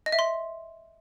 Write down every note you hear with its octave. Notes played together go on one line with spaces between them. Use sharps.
D#5
E5
C6